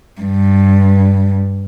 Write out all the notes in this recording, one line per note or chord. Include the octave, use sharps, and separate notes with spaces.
G2